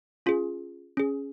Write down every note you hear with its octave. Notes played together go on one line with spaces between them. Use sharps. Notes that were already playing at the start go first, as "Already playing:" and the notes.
C#4 F4 G#4
C#4 G#4